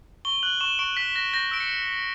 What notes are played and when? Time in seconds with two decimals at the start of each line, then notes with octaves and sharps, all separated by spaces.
0.25 C#6 G7
0.43 F#6 F#7
0.61 C#6 E7
0.79 C#6 D7
0.97 F#6 B6
1.15 F#6 A#6
1.34 G6 A#6
1.51 E6 D7
1.60 C#7